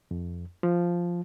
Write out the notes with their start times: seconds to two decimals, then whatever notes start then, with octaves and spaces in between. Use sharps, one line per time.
0.11 F2
0.63 F3